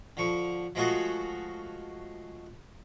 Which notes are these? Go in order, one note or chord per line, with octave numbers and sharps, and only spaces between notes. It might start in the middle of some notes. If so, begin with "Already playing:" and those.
D3 F3 C#6
F3 G#3 A3 F4 F#4 G#4